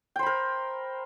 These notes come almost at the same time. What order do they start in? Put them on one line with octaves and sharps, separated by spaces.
G5 C5 B5 A#4